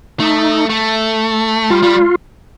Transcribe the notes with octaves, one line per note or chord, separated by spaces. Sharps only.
A3 D#4
A3
G3 F4
G3